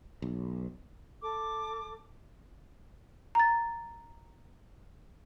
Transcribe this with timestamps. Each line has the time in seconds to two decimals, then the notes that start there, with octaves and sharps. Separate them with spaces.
0.22 B1
1.21 A4 D6
3.35 A#5 A6